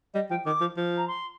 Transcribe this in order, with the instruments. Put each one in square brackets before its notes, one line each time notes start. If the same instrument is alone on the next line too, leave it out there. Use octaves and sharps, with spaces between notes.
[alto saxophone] G3 [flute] D#5
[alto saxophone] F3 [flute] G5
[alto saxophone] D#3 [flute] D6
[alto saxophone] F3
F3
[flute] A#5
C6